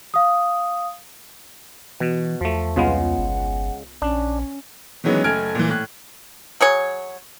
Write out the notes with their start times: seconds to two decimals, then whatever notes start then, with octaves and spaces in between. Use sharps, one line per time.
0.14 F5 D#6
2.00 B2 E3 F#4
2.41 E2 F3 A3
2.76 C2 C#3 G#3 B3 F4 F#5
3.18 G1
4.02 A#1 C#4 D4
5.04 D#3 E3 F#3 G#3 B3 C#4
5.24 F#1 A3 G#5 F6 G#6 D7
5.55 A#2 E3
5.69 A2 F#6
6.61 F#3 G#4 C#5